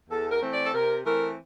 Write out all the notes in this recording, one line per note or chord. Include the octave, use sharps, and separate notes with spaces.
E2 A4
A#4
E3 A3 C4
D5
A4
C3 A#4
E3 A3 C4 A#4